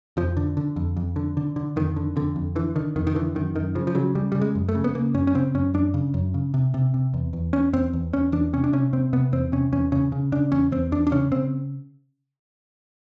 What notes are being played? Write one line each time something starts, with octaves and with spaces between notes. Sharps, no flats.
F2 F3
D3
D3
F2
F2
D3
D3
D3
F2 D#3
D3
F2 D3
F2
D3 E3
D3 D#3
F2 D#3
D#3
D3 E3
F#2 D#3
F#2 D#3
C#3 F3
F3
C#3 F#3
C#3 G3
C#3 G3
G#3
F#2
A3
C#3
B3
C#3 A#3
F#2 C#4
C#4
C#3 C4
F#2 C#4
F#2 D4
C#3
F#2
C#3
C3
C3
C3
E2
E2
E2 C#4
E2 C4
E2
E2 C#4
E2 D4
C3 C#4
D4
C3 C#4
C3 C4
C3 B3
E2 C4
C3 C#4
E2 C#4
C#3 C#4
C#3
C#3 D4
E2 C#4
E2 C4
E2 D4
D4
C#3 C#4
C#3 C4